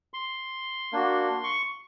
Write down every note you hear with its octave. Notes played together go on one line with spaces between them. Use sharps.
C6
A#3 D4 F#4
C#6